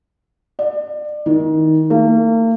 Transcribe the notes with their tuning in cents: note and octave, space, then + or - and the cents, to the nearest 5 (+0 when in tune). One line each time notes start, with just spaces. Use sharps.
D5 +30
D#3 +20
A#3 -40